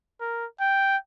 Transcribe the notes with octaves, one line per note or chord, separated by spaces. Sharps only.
A#4
G5